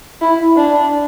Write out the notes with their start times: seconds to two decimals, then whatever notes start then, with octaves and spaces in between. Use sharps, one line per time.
0.21 E4
0.56 D4